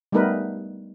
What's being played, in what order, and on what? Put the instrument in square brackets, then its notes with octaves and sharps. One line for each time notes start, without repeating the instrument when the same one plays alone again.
[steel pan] G3 A3 B3 D#4 A#4 B4